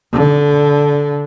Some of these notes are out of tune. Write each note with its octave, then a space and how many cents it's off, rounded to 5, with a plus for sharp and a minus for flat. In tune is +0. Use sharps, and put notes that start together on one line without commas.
D3 -15